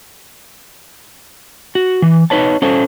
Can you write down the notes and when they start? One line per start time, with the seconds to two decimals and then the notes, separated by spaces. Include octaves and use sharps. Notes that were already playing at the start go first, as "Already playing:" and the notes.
1.75 F#4
2.02 E3
2.30 D#4 B4 C#5 A5
2.62 C#4 A4 C5